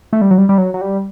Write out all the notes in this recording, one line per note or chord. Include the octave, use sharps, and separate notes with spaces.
A3
G3
F#3
G3
G3
F#3
F#3
G3